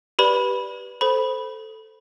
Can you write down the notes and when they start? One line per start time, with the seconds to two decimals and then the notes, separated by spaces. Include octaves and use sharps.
0.19 G4 B4 D5 B5
1.01 A4 C5 B5